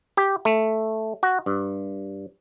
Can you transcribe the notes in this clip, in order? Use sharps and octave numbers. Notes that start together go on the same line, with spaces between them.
G4
A3
F#4
G2